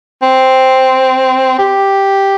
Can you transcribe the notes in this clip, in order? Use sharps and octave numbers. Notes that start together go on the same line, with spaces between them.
C4
G4